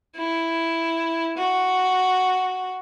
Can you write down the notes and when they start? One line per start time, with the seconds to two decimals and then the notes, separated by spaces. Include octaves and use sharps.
0.16 E4
1.37 F#4